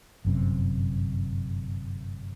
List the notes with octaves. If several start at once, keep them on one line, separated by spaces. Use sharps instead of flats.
G1 F#2 C3